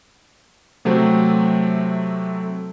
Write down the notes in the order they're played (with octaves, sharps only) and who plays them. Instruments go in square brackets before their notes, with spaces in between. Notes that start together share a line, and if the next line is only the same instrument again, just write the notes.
[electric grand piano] C3 F#3 A3 C4